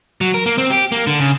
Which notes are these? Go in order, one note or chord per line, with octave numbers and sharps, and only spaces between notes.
F#3
A#4
A#3
C4
G4
A#3
D3
C#3